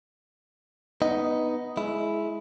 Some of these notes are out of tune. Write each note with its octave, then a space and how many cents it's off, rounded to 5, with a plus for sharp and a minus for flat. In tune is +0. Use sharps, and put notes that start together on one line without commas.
B3 +0 D#4 +0 D#5 +0
G#3 +25 E4 +0